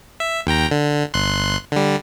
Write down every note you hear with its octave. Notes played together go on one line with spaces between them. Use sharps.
E5
D#2 G5 A#5
D3
G1 C6 F#6
D3 G3